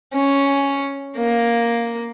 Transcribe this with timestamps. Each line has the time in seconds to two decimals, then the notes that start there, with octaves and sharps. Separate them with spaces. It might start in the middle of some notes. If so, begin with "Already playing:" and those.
0.14 C#4
1.16 A#3